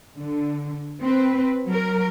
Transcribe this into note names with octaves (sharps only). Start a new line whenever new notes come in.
D3
C4 B4
F#3 A#4